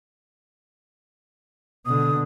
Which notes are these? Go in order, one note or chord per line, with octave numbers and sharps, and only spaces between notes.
B2 D3 D#6